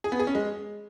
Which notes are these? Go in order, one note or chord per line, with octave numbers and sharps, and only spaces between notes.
G#4
B3
G#4
C#4
G#3